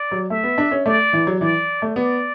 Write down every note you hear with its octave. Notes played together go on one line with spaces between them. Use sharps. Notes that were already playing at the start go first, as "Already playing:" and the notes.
Already playing: D5
F#3
A3 E5
B3
D4
C#4
A3 D5
E3
F#3
E3 D5
A3
B3 D5